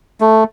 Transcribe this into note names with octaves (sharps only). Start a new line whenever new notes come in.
A3